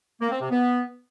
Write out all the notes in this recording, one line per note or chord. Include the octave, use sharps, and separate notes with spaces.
A#3
C4
C3
B3